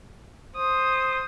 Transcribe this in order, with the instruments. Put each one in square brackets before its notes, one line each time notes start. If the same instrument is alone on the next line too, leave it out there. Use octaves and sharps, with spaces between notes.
[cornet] C5 [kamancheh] D#6